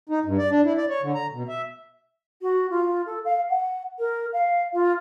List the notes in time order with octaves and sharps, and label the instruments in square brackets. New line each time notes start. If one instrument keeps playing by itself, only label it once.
[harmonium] D#4
G2
D5
D4
E4
D5
C#5
D3
A#5
B2
E5
[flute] F#4
F4
A4
F5
F#5
A#4
F5
F4